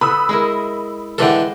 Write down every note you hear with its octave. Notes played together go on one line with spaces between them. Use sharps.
D3 B4 B5 D#6 E6
G#3 E4 A#4
D3 E3 G#3 A4 G5